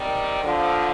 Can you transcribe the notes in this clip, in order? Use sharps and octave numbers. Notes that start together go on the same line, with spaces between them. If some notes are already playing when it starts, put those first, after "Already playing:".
Already playing: C3 D#3 G3
D3 F3